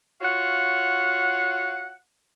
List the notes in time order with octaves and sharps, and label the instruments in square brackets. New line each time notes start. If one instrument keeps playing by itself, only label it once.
[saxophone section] F4 F#4 C#5 F5 F#5